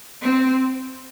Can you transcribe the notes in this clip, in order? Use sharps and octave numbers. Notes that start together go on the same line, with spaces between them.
C4